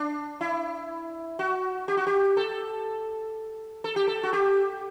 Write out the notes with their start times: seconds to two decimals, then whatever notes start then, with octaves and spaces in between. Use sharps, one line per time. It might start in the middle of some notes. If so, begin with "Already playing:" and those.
Already playing: D4
0.41 E4
1.39 F#4
1.88 G4
1.97 F#4
2.07 G4
2.37 A4
3.84 A4
3.96 G4
4.08 A4
4.23 F#4
4.33 G4